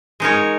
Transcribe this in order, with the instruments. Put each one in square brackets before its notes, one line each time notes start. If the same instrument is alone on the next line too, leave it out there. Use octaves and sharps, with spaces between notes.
[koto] G#3 D#4 A#4 C#5